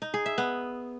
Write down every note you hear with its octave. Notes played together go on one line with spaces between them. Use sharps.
D#4
G#4
E5
B3